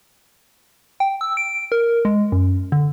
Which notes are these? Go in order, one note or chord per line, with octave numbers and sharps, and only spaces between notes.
G5
E6
D7
A#4
G#3
F#2
D3